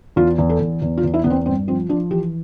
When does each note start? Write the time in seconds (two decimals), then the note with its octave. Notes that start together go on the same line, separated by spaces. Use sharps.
0.16 E2 F4
0.38 E2
0.50 A4
0.60 E2
0.82 E2
0.98 F4
1.03 E2
1.14 E4
1.24 E2 B3
1.30 C4
1.46 G2 C4
1.68 F3 C4
1.89 F3 D4
2.11 E3 G4